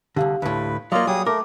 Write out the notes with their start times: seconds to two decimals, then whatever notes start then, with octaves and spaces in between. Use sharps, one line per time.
0.16 C2 G2 D3 G4 F5
0.42 D2 A2 B4
0.92 F#3 A#3 F4 D5 D#5 F5
1.07 F#3 G3 G#4 D#6
1.26 A3 A#4 D6